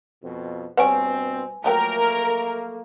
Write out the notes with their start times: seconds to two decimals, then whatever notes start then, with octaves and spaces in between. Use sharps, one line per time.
0.23 F2 B2
0.77 G2 B2 G3 C4 B4 C#5 F#5 G#5
1.64 F3 F#3 A3 A#3 A#4 G5